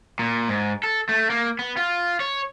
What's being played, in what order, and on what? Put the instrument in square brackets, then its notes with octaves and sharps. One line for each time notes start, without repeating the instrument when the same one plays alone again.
[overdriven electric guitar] A#2
G#2
A4
A3
A#3
B3
F4
C#5